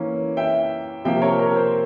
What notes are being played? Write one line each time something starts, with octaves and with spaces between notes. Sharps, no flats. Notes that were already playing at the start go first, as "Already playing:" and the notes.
Already playing: E3 A#3 C#4
E5 G5
C3 F3 A#3 E5 G5
A#4 C#5
A#4
C5